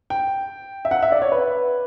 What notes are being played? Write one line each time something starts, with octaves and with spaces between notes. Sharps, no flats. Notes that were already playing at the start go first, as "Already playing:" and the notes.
G5
E5
F#5
E5
D5
C#5
B4